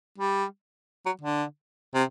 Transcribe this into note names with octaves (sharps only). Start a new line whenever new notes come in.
G3
F#3
D3
C3